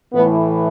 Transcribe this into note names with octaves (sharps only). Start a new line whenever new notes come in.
A2 E3 B3